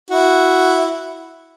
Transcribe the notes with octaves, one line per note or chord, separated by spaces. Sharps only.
E4 F#4